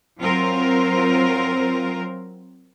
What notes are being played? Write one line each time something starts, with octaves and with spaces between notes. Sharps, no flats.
F#3 C4 F4 A#4 C5